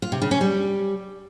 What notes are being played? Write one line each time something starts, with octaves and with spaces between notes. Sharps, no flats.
F4
C3
C#3
C#4
G3